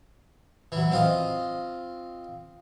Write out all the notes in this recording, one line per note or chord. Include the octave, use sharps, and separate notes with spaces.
E3 F#3
C4 F4 D#5